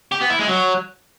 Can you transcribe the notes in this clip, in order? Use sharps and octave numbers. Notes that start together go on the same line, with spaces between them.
G4
B3
E4
G#3
F#3